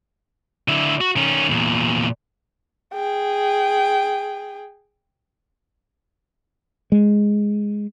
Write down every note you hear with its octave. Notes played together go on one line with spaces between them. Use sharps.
D3 E4
F#4
D#3 C#4
E2 A#2
G#4 G5
G#3